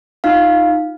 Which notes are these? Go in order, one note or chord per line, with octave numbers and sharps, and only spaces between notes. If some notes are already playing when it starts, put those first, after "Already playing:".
D#4 F4 F5